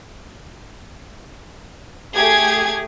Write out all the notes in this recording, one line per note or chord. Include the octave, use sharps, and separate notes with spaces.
A3 G4 G#4 G#6